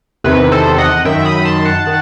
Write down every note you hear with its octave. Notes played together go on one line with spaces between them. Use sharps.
E2 C3 D#3 B4
A4 C5
D#5 F#5
F#2 D#3 E5 G5
B5 D#6
A5 C6
F#5 A5
D#3